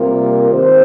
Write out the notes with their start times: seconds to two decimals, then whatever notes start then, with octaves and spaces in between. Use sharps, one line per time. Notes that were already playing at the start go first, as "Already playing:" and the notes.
Already playing: C3 G3 A#3 F4 A#4
0.51 D#3 C4 G4 C5